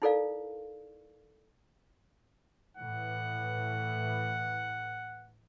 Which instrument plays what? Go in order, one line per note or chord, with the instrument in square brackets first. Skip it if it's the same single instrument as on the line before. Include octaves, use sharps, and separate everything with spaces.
[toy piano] D#4 E4 A4 A#4 D5 F5
[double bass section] A2 E3 [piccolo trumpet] F#5